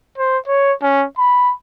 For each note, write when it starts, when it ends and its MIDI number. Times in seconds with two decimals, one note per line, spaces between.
0.18 0.38 72
0.47 0.72 73
0.82 1.05 61
1.18 1.53 83